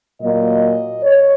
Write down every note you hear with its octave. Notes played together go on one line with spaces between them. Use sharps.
A#2 F#3 A#3 D#5
C#5